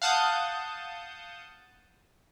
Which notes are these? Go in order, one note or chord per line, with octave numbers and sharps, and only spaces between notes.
F5 F#5 A5 D#6 G6